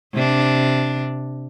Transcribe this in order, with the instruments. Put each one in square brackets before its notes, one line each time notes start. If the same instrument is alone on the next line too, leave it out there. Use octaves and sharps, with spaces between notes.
[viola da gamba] C3 D4